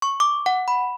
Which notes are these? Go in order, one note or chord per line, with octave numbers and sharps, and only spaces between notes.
C#6
D6
F#5
B5